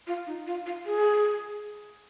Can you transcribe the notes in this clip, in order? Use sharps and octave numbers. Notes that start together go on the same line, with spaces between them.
F4
D#4
F4
F4
G#4